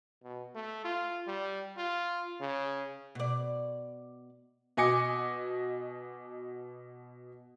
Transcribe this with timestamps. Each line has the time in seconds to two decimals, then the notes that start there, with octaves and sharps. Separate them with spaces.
0.23 B2
0.55 A3
0.85 F4
1.27 G3
1.77 F4
2.41 C#3
3.15 B2 D5
4.77 B2 D#5 G#5 D6 C#7